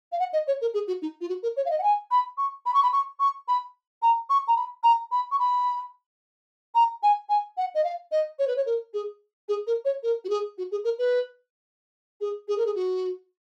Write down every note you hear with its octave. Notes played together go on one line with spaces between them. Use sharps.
F5
F#5
D#5
C#5
A#4
G#4
F#4
D#4
F4
F#4
A#4
C#5
F5
D#5
F#5
G#5
B5
C#6
B5
C#6
B5
C#6
C#6
B5
A#5
C#6
A#5
B5
A#5
B5
C#6
B5
A#5
G#5
G#5
F#5
D#5
F5
D#5
C#5
B4
C#5
A#4
G#4
G#4
A#4
C#5
A#4
F#4
G#4
F#4
G#4
A#4
B4
G#4
G#4
A#4
G#4
F#4